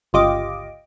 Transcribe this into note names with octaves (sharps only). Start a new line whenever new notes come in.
G1 C#2 F4 G4 D#5 D6